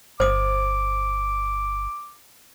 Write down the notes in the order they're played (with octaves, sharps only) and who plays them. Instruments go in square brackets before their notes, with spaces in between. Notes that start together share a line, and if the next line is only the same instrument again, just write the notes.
[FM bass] G1 [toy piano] C5 D#6 [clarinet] D6